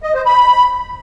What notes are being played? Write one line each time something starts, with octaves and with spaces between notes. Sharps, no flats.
D#5
C5
B5